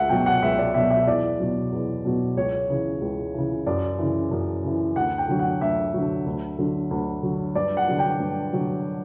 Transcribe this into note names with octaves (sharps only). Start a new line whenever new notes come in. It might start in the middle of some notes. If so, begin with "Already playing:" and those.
Already playing: C#2 E5 F#5
B2 F#3 G5
F#5
C#2 E5
D5
B2 F#3 E5
E5
E2 D5
B2 F#3
E2
B2 F#3
C#2 C#5
C#3 E3
C#2
C#3 E3
F#2 D5
C#3 E3
F#2
C#3 E3
D2 F#5
G5
D3 F#3
F#5
D2 E5
D3 F#3
D2
D3 F#3
D2
D3 F#3
G2 D5
F#5
D3 F#3
G5
G2
D3 F#3